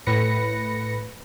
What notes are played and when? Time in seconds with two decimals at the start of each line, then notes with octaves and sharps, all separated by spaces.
0.07 A2 B4 A#6 C#7